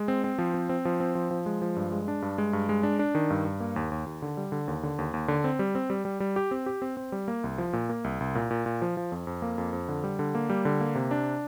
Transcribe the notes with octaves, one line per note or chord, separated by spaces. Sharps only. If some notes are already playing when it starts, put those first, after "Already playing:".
Already playing: G#3
C4
C4
F3
C4
C4
F3
C4
F3
F3
G#3
F3
G2
G#3
D4
G2
G#3
G2
G#3
D4
D4
D#3
G2
G2
A#3
D#2
D#2
D#2
D3
G3
D3
D#2
D3
D#2
D#2
D3
C4
G3
C4
G3
G3
G3
G4
C4
G4
C4
C4
G3
A#3
C2
F3
A#2
A#3
C2
C2
A#2
A#2
A#2
F3
F3
F2
F2
A#3
F2
F2
D3
G3
D3
A#3
G3
D3
A#3
C3
D4